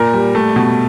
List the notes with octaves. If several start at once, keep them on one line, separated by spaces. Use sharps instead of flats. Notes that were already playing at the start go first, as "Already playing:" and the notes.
Already playing: A#2 A#4
G3
A3
B2